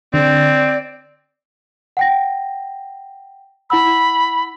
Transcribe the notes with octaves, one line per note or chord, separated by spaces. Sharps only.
D3 C4 D5
F#5 G5 A#6
E4 F#5 B5 E6